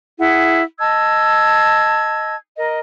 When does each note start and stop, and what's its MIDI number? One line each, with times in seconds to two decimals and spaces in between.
0.19 0.63 64
0.19 0.63 68
0.19 0.63 78
0.80 2.35 75
0.80 2.35 81
0.80 2.35 88
0.80 2.35 92
2.56 2.80 70
2.56 2.80 75